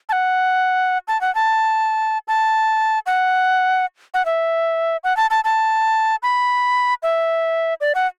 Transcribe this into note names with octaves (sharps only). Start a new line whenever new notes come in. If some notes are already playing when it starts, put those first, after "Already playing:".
A5
F#5
A5
F#5
A5
A5
F#5
F#5
E5
F#5
A5
A5
A5
B5
E5
D5
F#5